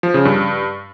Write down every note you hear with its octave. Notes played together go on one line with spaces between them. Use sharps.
F3
C#3
G2